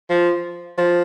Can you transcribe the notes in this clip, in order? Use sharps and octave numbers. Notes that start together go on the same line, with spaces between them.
F3
F3